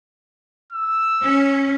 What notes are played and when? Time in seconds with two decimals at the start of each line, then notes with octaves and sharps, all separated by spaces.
0.72 E6
1.22 C#4